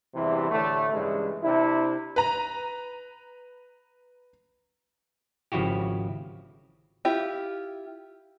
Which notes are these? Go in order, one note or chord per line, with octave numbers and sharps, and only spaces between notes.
E2 G2 C3 E3
A2 D3 A3
G2 C#3 E3 G#3 A3
C3 D4 E4
B4 A#5
G#1 C#3 F3 E4 F#4 G4
E4 F4 G4